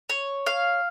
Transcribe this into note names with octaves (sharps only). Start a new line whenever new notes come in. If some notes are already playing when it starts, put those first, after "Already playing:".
C#5
F5